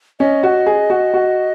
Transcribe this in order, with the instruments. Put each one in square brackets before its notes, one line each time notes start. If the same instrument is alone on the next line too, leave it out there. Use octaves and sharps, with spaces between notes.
[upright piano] C#4 [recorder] D#5
[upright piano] F#4
G#4
F#4
F#4